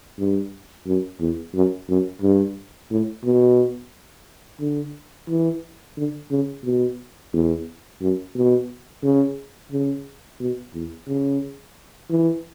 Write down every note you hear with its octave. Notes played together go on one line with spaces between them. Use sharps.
G2
F#2
E2
F#2
F#2
G2
A2
B2
D3
E3
D3
C#3
B2
E2
F#2
B2
C#3
C#3
B2
E2
C#3
E3